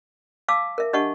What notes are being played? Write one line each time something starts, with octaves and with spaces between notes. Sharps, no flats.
F5 A5 D6 E6
A#4 E5
D4 G4 D#5 F#5 A5 C#6